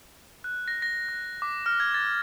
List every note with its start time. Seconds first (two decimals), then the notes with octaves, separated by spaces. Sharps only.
0.44 F#6
0.68 A#6
0.82 A#6
1.09 F#6
1.42 D6
1.66 F6
1.80 G#6
1.94 A6